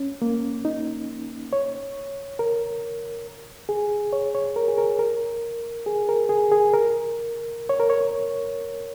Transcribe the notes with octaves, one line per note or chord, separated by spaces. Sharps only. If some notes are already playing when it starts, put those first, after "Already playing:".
Already playing: C#4
A#3
D#4
C#5
A#4
G#4
C#5
C#5
A#4
G#4
A#4
A#4
G#4
A#4
G#4
G#4
A#4
C#5
A#4
C#5